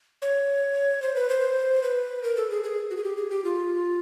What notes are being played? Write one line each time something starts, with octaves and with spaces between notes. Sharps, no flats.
C#5
C5
B4
C5
B4
A#4
A4
G#4
G#4
F#4
G#4
G4
G#4
G4
F4